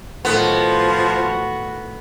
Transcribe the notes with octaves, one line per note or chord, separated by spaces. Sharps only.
A2 D#3 F3 F#3 B3 F#4